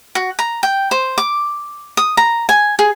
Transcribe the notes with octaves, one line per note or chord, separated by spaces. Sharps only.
F#4
A#5
G5
C5
D6
D#6
A#5
G#5
G#4